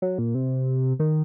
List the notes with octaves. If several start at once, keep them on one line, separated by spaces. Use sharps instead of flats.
F#3
A#2
C3
D#3